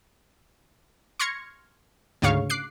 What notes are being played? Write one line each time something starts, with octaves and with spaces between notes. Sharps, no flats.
C6 C#6 F6 G#6 A#6 C#7
D2 G#2 C#3 C#5 F5 C#6
D6 F#6 C7